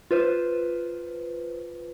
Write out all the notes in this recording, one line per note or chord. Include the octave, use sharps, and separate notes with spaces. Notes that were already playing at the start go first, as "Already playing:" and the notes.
F4 B4 C5